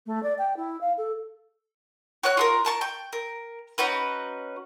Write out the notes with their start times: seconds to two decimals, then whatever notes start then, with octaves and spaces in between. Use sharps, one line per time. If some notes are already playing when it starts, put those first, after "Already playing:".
0.06 A3
0.23 D5
0.38 G5
0.56 E4
0.81 F5
0.97 A4
2.23 F#4 C#5 F#6
2.37 F4 G#4 A#4
2.65 A#4 A5 C#6
2.81 G5
3.13 A#4
3.78 C#4 D#4 F#4 B4